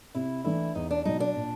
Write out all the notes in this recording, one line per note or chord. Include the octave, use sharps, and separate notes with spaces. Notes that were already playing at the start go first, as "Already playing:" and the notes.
C3 E4
E3 A3 D4 E4
E2 D#4
D4
B2 F#3 D#4
D4
A#2